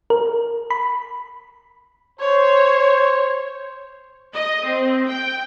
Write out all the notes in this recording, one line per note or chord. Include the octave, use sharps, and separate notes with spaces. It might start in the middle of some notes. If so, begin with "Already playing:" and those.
A#4
B5
C5 C#5
D#5
C4
G5